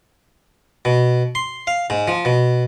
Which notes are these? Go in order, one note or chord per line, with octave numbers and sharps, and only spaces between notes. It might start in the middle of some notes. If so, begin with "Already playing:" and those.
B2
C6
F5
G#2
F3
B2